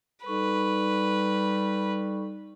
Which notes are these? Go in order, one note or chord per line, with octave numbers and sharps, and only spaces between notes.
G3 D#4 A4 B4 C#6